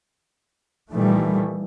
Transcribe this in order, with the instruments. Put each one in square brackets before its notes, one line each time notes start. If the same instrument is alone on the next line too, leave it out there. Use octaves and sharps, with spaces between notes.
[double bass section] A#2 D#3 E3 G3 A3